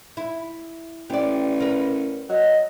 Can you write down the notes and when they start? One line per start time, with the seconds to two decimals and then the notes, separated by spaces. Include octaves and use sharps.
0.17 E4
1.10 A1 G4 D5
1.60 A#4 B4
2.29 F#3 D#5